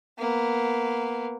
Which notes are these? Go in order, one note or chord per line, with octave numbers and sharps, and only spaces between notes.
A#3 B3